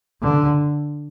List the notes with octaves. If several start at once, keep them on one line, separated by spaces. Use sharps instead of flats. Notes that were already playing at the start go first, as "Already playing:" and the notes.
D3